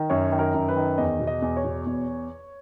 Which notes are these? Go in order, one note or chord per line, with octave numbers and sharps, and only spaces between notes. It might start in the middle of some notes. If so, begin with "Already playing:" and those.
Already playing: D#3
F#2 C#5
D#3
A#4
F#2
B4
D#3
E2 D#5
B2
D#5
E2
C#5
B2
E2